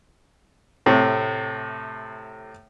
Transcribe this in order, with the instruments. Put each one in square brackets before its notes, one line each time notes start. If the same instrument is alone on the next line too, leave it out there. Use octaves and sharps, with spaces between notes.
[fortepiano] A2 C3